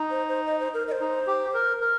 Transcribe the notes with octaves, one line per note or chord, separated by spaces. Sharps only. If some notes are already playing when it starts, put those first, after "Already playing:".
Already playing: D#4
C5
C5
D#5
C5
A#4
D#5
C5
D#4
G4
A#4
A#4